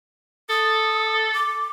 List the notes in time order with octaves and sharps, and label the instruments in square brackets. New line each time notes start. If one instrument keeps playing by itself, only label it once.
[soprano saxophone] A4 [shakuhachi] D#6
[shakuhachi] D6